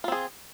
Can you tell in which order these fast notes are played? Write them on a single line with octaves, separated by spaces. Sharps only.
F4 C4 G#4